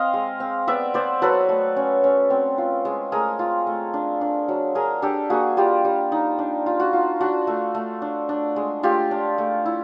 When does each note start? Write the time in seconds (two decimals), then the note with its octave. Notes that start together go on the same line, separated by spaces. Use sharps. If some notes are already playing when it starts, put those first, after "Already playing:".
Already playing: C4 D#5 F5
0.14 G#3
0.40 C4
0.68 B3 D5 E5
0.94 B3 C5 D5
1.22 F#3 A4 B4
1.49 A3
1.76 C#4
2.04 C#4
2.30 C4
2.58 F4
2.85 G#3
3.12 A3 G#4 A#4
3.39 F4
3.67 A3
3.94 D4
4.21 D4
4.48 F#3
4.75 D4 G#4 A#4
5.02 D4 G4 A4
5.30 A#3 F#4 G#4
5.57 G3 F4 G4
5.85 G3
6.12 D#4
6.39 D4
6.66 F4
6.80 F#4
6.93 F4
7.21 D4 F#4
7.47 A3
7.75 A3
8.02 D4
8.29 D4
8.56 G#3
8.83 A3 F4 G4
9.11 D4
9.38 A3
9.66 E4